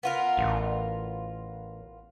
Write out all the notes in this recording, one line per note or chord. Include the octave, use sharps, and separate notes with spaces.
B3 F4 A#4
A1